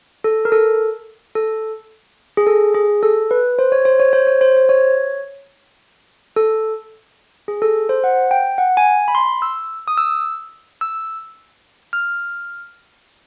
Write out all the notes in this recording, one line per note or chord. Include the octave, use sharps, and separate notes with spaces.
A4
A#4
A4
A4
G#4
A4
G#4
A4
B4
C5
C#5
C5
C#5
C5
C#5
C5
C5
C#5
A4
G#4
A4
C5
F#5
G5
F#5
G#5
B5
C6
E6
D#6
E6
E6
F6